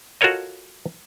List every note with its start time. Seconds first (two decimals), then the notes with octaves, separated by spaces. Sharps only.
0.21 F4 F#4 A4 A#4 C#5 D#5